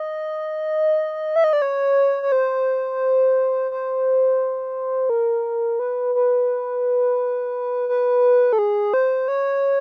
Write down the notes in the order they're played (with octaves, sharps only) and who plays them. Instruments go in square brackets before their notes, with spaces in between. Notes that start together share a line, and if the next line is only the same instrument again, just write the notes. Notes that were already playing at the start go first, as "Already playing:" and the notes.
Already playing: [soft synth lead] D#5
E5
D#5
D5
C#5
C#5
C5
C5
A#4
B4
B4
B4
A4
G#4
C5
C#5